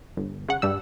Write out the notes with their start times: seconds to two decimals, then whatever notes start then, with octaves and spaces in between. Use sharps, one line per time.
0.17 G1
0.48 C#3 F#5
0.62 G2 G3 E6